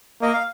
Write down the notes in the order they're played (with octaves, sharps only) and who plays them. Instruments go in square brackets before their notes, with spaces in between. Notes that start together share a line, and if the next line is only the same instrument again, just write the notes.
[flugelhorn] A#3 [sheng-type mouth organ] D#5
[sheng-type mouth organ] F5